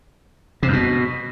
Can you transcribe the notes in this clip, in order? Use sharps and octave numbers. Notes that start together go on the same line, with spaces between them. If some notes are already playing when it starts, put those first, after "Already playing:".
C3
F#2
B2